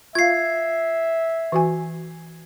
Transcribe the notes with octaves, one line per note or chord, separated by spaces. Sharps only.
F4 E5 F5 G#6 C7
E3 F#4 G#5